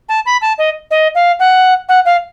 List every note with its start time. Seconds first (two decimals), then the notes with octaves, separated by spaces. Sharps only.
0.09 A5
0.25 B5
0.41 A5
0.58 D#5
0.91 D#5
1.15 F5
1.39 F#5
1.89 F#5
2.05 F5